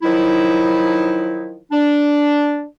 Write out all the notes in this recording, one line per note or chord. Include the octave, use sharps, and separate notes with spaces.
D#3 F3 F#3 D#4 E4
D4